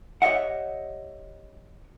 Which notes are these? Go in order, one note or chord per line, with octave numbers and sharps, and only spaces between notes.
G4 C#5 D#5 E5 F#5